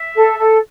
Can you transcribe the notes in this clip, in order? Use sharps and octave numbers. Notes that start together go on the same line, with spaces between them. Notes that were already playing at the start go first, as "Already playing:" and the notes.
Already playing: E5
A4
A4